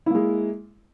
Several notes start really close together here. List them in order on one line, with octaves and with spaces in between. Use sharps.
E4 A#3 G#3